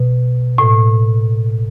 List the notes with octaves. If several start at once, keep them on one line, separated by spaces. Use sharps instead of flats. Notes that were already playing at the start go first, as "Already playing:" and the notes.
Already playing: B2
A2